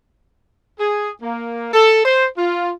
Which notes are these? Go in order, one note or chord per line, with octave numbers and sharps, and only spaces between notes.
G#4
A#3
A4
C5
F4